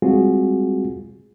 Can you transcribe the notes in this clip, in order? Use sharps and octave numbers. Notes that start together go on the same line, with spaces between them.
G3 G#3 C4 F4 F#4 G#4